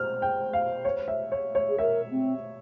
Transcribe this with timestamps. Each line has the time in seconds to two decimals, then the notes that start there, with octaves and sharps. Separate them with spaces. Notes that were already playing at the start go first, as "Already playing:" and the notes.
Already playing: C5 F6
0.22 G5
0.53 F5
0.85 C#5
1.08 E5
1.32 C#5
1.55 C#5
1.69 G#4
1.78 A#4 E5
2.10 C4